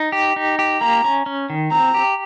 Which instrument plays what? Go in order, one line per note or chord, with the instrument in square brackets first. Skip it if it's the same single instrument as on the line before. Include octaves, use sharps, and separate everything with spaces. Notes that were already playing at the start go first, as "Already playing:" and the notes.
Already playing: [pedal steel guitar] D#4
G4
D#4
G4
[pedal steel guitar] A#3 [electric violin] A#5
[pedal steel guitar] C#4
C#4
D#3
[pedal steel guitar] C4 [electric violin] A#5
[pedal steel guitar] G4